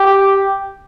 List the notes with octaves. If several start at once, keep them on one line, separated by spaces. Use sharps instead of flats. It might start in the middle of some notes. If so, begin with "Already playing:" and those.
Already playing: G4